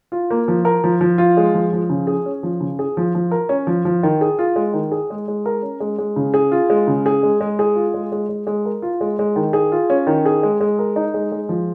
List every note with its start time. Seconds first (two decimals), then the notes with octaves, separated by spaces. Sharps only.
0.12 F4
0.31 A#3
0.48 F3
0.65 A#4
0.84 F3
1.01 F3
1.18 F4
1.37 G#3
1.54 F3
1.73 F3
1.90 C#3
2.07 G#4
2.26 C#4
2.43 F3
2.60 C#3
2.79 G#4
2.97 F3
3.15 F3
3.31 A#4
3.49 C#4
3.67 F3
3.85 F3
4.03 D#3
4.21 G#4
4.39 F4
4.56 G#3
4.74 D#3
4.92 G#4
5.10 G#3
5.28 G#3
5.46 A#4
5.62 C#4
5.80 G#3
5.98 G#3
6.16 C#3
6.34 G#4
6.52 F4
6.70 G#3
6.87 C#3
7.06 G#4
7.23 G#3
7.41 G#3
7.59 G#4
7.76 F4
7.94 G#3
8.12 G#3
8.29 G#3
8.47 G#3
8.65 A#4
8.82 F4
9.01 G#3
9.19 G#3
9.36 D#3
9.53 G#4
9.72 F4
9.90 C#4
10.07 D#3
10.26 G#4
10.43 G#3
10.60 G#3
10.79 A#4
10.96 D#4
11.14 G#3
11.32 G#3
11.49 F3